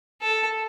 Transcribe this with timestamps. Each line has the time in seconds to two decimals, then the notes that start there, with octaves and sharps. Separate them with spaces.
0.21 A4